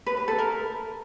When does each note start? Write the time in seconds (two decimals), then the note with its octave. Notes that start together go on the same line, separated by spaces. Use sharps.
0.06 B4
0.17 B4
0.28 A4
0.38 A#4